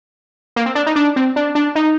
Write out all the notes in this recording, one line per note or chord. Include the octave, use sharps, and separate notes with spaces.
A#3
C4
D4
D#4
D4
C4
D4
D4
D#4